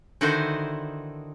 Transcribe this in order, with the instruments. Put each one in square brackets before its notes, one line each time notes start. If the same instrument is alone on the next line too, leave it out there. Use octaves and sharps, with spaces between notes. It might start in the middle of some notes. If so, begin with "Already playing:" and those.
[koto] D3 D#3 D#4 E4 F#4 C5